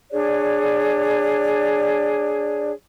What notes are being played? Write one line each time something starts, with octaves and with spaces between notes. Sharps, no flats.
D4 G#4 C#5 D5